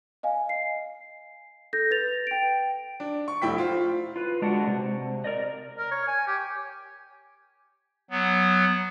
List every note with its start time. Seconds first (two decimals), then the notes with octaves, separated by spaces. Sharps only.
0.23 D#5 F5 G#5
0.49 C7
1.73 A4 G6 A#6
1.91 B4 A6 F7
2.27 G5 D7
3.00 D4
3.28 C#6
3.42 F1 E4 G5 B6
3.58 F4 C5
4.16 F4 B4
4.41 D3 G#3 D4 F#4 F#5
4.67 C3
5.24 A#4 D5 D#5
5.78 A#4
5.91 C#5
6.08 G#5
6.27 G4
8.11 F#3 B3